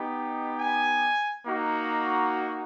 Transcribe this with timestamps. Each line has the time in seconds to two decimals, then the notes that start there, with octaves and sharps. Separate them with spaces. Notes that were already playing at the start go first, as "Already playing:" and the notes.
Already playing: B3 D#4 G4
0.57 G#5
1.46 A#3 D#4 F#4